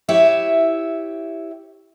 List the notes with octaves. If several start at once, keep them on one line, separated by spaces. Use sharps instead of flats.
E4 G4 C#5 E5